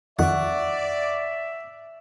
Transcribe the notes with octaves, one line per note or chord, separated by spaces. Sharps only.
F2 D#3 D5 E5 F#5 C#6